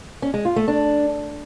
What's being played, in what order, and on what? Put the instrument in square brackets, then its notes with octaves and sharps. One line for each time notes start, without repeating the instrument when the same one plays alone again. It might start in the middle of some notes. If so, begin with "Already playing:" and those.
[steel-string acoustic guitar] C#4
G#3
F4
A3
D4